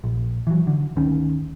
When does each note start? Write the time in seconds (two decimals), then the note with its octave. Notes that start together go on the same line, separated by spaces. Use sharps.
0.04 A#1
0.47 E3 F#3
0.67 D3
0.96 G1 D2 D#3 C#4